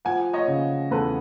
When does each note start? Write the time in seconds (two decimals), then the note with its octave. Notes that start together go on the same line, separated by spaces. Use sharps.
0.05 F3 F#5 G#5
0.33 C#5 D#5
0.48 C#3
0.91 E2 A4 B4